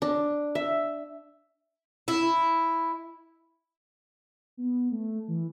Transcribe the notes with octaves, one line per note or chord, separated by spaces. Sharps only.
D4
E5
E4
B3
A3
E3